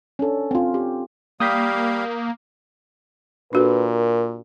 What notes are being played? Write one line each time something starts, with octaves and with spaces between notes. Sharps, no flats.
C#4 D4 A4
C4 F4
G4
G3 A#3 G4 F5 D#6 G6 B6
A#2 D4 F#4 A4 B4
A#4